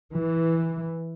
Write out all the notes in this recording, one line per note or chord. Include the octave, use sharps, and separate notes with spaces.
E3